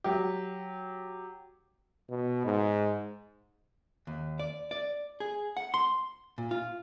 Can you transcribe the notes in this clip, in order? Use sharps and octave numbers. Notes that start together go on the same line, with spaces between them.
F#3 G4
B2
G#2
D#2
D5
D5
G#4
F#5
C6
A#2
F4